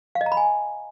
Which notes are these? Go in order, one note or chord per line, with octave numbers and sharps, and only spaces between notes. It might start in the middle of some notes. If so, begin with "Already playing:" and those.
F5
D#5
A#5
B5
G#5